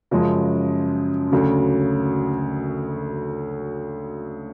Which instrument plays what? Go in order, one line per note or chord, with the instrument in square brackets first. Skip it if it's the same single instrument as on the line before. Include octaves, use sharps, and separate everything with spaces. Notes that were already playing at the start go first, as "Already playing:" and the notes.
[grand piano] F#2 C#3 F3 G#3
D2 C#3 F#3